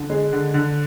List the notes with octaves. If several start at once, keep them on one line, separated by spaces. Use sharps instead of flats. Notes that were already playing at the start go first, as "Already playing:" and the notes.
Already playing: D3
G#3
D3
D3